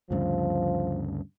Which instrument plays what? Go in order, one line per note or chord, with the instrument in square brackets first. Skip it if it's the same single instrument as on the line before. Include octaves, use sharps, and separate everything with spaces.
[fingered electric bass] D2 G2 C#3 [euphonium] F3